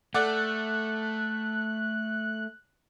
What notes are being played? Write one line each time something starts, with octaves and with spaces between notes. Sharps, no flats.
A3 A4 D5 F#5 F#6